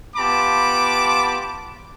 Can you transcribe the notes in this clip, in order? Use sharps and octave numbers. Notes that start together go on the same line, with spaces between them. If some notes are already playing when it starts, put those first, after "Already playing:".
B3 F4 G4 A5 B5 D6